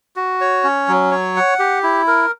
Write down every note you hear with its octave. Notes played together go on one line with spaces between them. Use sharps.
F#4
C#5
C#4
F#3
C#5
F#5
G4
E4
A#4